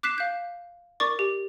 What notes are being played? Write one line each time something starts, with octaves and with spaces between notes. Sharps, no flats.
D6 F#6 B6 C7 E7
F5 G6
A#4 D5 C#6 D6 A6
G4